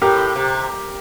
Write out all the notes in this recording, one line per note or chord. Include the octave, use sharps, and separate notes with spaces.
A2 G4 A#4
C3